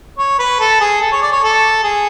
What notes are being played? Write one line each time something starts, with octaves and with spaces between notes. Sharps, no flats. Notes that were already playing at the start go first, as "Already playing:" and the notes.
C#5
B4
A4
G#4
A4
C#5
D5
C#5
A4
G#4